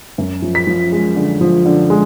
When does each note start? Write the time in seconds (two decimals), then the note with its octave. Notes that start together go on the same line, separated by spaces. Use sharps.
0.18 F#2
0.42 F3
0.55 B6
0.67 F3
0.92 G#3
1.16 D3
1.41 F3
1.66 D3
1.90 G#3